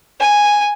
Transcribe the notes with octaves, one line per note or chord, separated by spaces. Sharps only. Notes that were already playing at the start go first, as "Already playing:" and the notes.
G#5